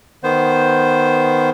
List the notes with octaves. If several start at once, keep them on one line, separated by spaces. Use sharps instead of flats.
D#3 B3 C5